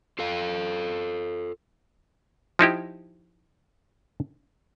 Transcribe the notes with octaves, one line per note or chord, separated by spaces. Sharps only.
F4 A4 F5
F3 D#4 E4 G4